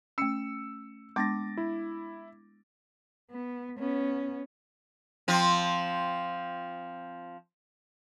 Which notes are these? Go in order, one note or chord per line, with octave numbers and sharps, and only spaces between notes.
A3 C#4 E6 C#7
G#3 B3 D4 D6 A6 A#6
E4
B3
B3 C#4
F3 C4